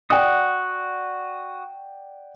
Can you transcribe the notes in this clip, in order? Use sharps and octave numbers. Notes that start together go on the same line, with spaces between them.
F#4 D5 F#5 G5 D#6